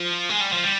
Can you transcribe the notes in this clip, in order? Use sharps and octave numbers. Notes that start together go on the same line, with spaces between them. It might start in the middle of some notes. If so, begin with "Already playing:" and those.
Already playing: F3
G#3
G3
F3
G3